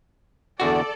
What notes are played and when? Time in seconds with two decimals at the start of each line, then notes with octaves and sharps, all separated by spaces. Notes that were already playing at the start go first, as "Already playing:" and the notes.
0.60 E2 D3 F#4 A4 D5